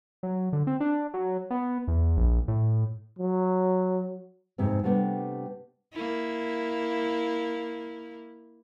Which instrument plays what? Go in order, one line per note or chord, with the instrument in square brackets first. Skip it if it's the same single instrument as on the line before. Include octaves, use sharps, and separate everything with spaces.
[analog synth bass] F#3
D3
C4
D4
F#3
B3
E2
A#1
A2
[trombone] F#3
[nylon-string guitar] F2 G#2 C3 C4
C3 G3 A3 B3 D4
[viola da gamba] A#3 E4